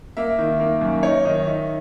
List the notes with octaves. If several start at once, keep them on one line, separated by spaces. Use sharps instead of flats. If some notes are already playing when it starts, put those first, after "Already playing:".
A#3 E5
D#3
A#3
F#2
D#4 C#5
D#3 D#5
D#4 E5